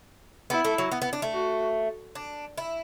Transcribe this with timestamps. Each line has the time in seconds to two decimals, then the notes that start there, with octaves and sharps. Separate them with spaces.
0.50 B3 E4
0.64 A3
0.78 F#3
0.92 B3
1.02 B3
1.13 D4
1.22 A3
1.33 F#4
2.15 D4
2.58 E4